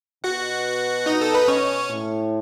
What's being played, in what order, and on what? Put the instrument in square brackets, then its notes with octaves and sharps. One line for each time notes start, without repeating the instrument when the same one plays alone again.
[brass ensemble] B2 [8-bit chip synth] F#4 F#5
[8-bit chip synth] D#4 D#5
A4
B4
C#4 C#5
[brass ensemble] A2